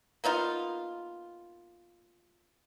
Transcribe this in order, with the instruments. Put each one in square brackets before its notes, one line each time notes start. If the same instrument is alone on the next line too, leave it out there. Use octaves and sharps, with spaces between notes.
[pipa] A#3 B3 D#4 F4